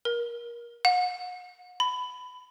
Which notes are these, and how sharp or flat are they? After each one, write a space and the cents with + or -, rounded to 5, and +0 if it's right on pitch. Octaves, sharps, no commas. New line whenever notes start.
A#4 +25
F#5 -40
B5 +20